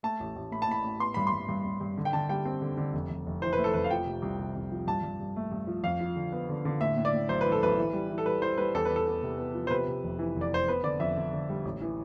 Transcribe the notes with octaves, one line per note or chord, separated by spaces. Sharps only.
A3 A5
A1
A1
A3 B5
A5
A2 B5
A2
B3 C6
G2 B5
C6
G2
G2
G2
G2
D3
G5
D3 A5
G3 G5
C4
D3
D3
F1
F1
F1
E3 C5
B4
A3
A4
F1 B4
F5
F3 G5
C3
C2
C3
C2
F3
G2 A5
G2
G2
A3
G2
F3
F2 F5
F3
D3
B3
D3
D3
A2 E5
A2
D5
A2
B1 C5
E3 B4
A4
B1 B4
E3
G3
E3
A4
G3 B4
E3 C5
G3 B4
E2 A4
E2 B4
A4
B3
C3
B3
F3
C5
C3 B4
C3
F1
E3
F1
D5
F1 C5
B3 B4
D3 D5
F2 E5
D3
D3
G3
A1
E3